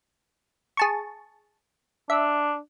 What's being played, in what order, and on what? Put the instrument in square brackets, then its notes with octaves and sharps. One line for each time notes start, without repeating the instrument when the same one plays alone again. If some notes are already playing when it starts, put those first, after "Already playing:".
[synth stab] G#4 A5 C#6
[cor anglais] D4 [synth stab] E5